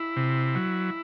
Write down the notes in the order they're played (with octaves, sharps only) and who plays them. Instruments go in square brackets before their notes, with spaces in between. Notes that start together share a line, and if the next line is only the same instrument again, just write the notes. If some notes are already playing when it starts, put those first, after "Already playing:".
Already playing: [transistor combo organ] E4
C3
F#3